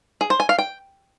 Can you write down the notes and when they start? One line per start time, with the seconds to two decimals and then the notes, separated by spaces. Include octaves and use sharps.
0.21 G#4
0.30 C5
0.40 G#5
0.49 F5
0.59 G5